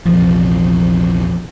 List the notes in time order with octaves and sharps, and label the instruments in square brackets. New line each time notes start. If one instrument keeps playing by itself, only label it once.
[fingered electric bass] A#1 E2 C3 [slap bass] F3